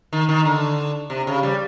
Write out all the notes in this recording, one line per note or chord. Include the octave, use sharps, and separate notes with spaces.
D#3
D#3
D3
C3
C#3
G3